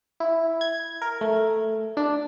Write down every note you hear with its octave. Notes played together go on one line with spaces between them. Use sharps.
E4
G#6
A#4
A3
D4